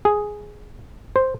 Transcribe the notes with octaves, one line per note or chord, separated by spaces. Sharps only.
G#4
C5